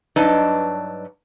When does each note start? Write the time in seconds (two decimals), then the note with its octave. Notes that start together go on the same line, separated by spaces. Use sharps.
0.16 G2 F#3 D4 D#4 B4 D#5